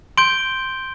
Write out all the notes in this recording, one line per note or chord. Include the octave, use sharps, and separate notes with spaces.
C6 G6 D7 G7